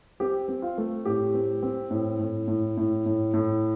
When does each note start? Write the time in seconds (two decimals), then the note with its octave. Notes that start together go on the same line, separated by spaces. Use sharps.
0.20 C4 G4
0.48 C4
0.62 F4
0.78 A3
1.05 A2 G4
1.34 C4
1.63 C4
1.91 A2
2.19 A2
2.48 A2
2.77 A2
3.06 A2
3.34 A2